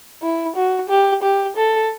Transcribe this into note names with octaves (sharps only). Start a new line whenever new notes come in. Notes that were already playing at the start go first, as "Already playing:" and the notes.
E4
F#4
G4
G4
A4